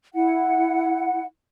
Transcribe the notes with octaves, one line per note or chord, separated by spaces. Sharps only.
E4 F#5